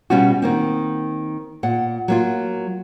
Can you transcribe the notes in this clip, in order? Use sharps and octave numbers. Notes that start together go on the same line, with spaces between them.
B2 G3 C#4 F4 F#4
D#3 A#3 C4
A#2 F#5
F#3 A#3 F4